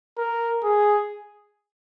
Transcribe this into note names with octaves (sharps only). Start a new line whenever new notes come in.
A#4
G#4